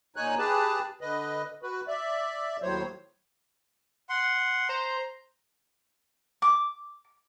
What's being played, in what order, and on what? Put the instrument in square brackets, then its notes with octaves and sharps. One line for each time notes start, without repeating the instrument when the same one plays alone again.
[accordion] A#2 D#4 C#5 G#5 F#6
G4 G#4 B4 A5
D3 B4 D#5
F#4 B4
D5 E5
D#2 A2 F#3 C5 C#5
[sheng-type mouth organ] F#5 C6
[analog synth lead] C5 [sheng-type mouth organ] A#5
[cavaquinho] D6